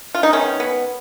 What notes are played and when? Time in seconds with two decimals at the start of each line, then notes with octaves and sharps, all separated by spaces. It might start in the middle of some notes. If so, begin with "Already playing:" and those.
0.15 F4
0.23 D#4
0.33 D#3 G#3 B3 C#4
0.60 B3